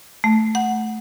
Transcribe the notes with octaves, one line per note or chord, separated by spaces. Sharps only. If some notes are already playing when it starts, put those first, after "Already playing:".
A3
F#5